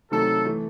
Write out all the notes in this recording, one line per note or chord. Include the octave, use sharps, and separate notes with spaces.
C3 D#3 F#3 A3 A4
E3 A3